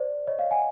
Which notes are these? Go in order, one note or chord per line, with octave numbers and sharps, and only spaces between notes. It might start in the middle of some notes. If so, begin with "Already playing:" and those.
Already playing: C5 D5
C#5 D#5
D#5 F5
F#5 G#5